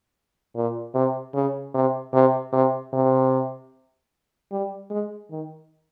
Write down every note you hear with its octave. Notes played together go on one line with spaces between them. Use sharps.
A#2
C3
C#3
C3
C3
C3
C3
G3
G#3
D#3